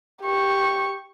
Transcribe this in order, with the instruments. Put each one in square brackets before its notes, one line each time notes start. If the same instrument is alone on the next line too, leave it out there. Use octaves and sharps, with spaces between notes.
[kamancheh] G4 C#6